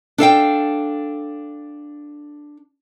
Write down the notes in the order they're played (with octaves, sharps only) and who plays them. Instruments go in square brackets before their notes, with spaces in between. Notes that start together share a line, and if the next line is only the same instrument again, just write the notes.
[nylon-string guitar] D4 A4 F5 G5